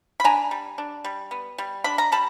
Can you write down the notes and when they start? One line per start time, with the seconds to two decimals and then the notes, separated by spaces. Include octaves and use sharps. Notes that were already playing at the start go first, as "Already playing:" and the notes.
0.20 B5
0.24 D4 G#5 A#5
0.51 G3
0.78 D4
1.04 G3
1.31 B3
1.58 G3
1.84 D4 B5
1.98 A#5
2.12 G3 A5 B5